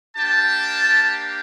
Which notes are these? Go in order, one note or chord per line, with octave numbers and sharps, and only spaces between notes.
A#3 D4 G4 G5 A5